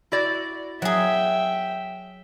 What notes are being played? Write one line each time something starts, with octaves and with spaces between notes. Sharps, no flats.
E4 F#4 D5
F#3 G#4 E5 G5